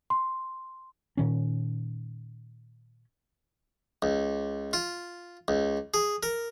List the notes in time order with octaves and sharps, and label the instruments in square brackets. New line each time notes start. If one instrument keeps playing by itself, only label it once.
[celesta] C6
[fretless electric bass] A#2 D#3 C#4
[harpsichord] C#2
F4
C#2
G#4
A#4